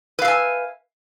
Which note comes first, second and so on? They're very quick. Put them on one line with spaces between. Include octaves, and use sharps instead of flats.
B4 F5 E5 G#5